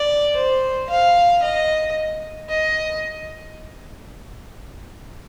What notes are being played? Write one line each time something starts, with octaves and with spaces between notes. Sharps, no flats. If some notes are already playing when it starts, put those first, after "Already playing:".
Already playing: D5
C5
F5
D#5
D#5